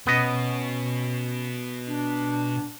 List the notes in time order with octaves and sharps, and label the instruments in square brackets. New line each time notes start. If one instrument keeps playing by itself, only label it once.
[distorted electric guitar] B2 [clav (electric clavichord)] B3 D#5 [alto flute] C#4
[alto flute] D4